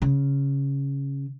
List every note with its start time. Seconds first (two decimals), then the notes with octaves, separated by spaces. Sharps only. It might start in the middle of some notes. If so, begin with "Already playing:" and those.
0.02 C#3